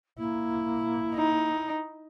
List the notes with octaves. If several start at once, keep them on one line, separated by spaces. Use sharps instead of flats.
A#3 E4
D#4